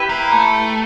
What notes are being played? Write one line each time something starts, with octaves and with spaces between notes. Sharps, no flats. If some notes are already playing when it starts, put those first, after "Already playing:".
Already playing: E4 G4 B4
A#3
A3